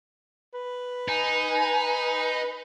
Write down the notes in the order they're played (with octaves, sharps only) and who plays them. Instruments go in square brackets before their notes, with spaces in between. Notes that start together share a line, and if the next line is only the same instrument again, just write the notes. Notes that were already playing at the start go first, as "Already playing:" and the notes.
[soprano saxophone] B4
[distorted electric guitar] D#4 [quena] G#5